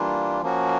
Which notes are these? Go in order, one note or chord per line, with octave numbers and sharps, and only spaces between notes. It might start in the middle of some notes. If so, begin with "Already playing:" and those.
Already playing: E3 G3 A#3 D4 F4
F3 A#3 C#4 F#4